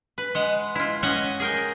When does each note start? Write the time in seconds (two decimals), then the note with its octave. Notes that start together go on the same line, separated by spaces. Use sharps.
0.18 B4
0.35 G#3 F#5
0.75 E4 F4
1.03 C#4 C#5 D#5 F#5 G#5
1.40 G#4 A#4 G5